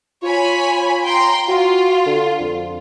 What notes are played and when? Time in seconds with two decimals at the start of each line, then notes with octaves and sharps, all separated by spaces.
0.23 F4 C#5 G#5 B5
1.04 G5 A#5 C6
1.48 F4 F#4
2.06 D3
2.41 F2